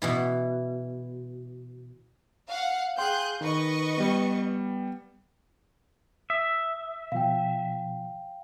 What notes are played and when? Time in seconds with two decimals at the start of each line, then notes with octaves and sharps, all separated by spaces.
0.02 B2 E3 E4
2.48 F5 F#5
2.98 G#4 F5 G5 C6 F#6 G6
3.41 D#3 B4 D#5 C#6
3.97 G3 B3
6.30 E5 D#6
7.12 B2 F3 F5 G5